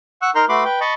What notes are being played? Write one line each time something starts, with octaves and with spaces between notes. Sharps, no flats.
F#5 C#6 E6 F#6
D#4 A#4 A#5 C6 F6 G6
A3 F#4 B4 B5 C6 D6
B4 G5
D#5 A5 B5 C#6